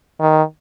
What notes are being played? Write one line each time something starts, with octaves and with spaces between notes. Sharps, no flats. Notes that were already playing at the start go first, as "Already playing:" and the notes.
D#3